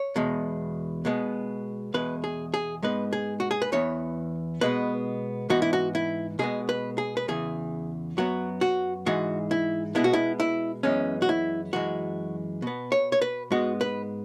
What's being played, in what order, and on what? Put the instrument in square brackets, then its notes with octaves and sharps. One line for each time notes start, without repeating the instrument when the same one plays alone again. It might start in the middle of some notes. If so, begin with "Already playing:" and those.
Already playing: [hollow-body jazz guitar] C#5
E2 B2 G#3
B2 G#3 B3
E2 B2 G#3 B4
G#4
G#4
G#2 G#3 B3 B4
G#4
F#4
G#4
B4
E2 E3 B3 C#5
B2 G#3 B3 B4
G#2 E3 B3 F#4
E4
F#4
E4
B2 G#3 B3 G#4
B4
G#4
B4
E2 C#3 E3 G#4
F#2 F#3 B3 F#4
F#4
G#2 E3 G#3 F#4
E4
B2 G#3 B3 E4
F#4
E4
E4
F#2 E3 G#3 B3 C#4
F#4
E4
F#2 E3 G#3 F#4
B2 B3
C#5
C#5
B4
G#2 G#3 B3 F#4
B4